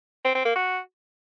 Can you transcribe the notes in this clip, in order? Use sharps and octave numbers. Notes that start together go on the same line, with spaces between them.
C4
C4
A#3
F#4